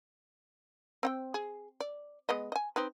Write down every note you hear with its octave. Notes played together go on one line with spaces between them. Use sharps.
C4 F#5 G5
G#4
D5
G#3 B3 D#5
D#5 G#5
C4 D#4 B4